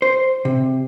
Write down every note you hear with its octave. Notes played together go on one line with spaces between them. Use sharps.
C5
C3